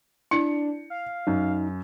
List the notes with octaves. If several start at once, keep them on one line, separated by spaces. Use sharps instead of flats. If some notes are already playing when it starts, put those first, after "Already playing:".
D4 E4 C#7
F5
F#2 D#4